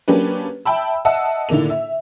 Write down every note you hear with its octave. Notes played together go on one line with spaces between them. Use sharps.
F#3 A#3 C#4 D4 G4 B4
E5 G5 A5 B5 E6
D#5 E5 F#5 A5 E6
A2 D3 D#3 A#3 F7
E5